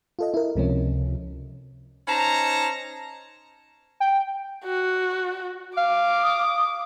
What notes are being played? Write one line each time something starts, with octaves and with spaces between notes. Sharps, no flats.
F4 A4 D#5
E4 A#4
C#2 C3 F3 C#4
C#4 D#4 C5 A5 A#5
G5
F#4
F5 D6
D#6